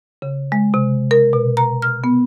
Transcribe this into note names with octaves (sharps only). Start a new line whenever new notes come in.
C#3
G#3
C3
A#4
B2
A#5
F6
B3